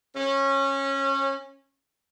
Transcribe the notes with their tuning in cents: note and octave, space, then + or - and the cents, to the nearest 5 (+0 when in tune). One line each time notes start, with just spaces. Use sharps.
C#4 -20